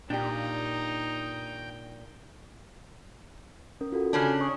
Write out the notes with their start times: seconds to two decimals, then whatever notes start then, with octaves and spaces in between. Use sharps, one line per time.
0.10 A#2 D4 D#4 G4 G5
3.81 C#4 A#4
3.92 F4 F#4 A4
4.13 C#3 C#4 D4
4.40 C#5 C#6 D#6